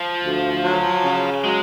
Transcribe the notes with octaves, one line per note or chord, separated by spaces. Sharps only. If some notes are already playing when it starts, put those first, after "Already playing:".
Already playing: F3
D2
F#3
C#3
F#3 G#3